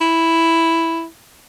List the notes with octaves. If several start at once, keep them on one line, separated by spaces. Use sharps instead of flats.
E4